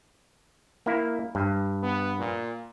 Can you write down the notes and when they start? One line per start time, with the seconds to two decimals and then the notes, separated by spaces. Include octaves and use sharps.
0.86 A#3 E4
1.35 G2
1.83 B3
2.19 A#2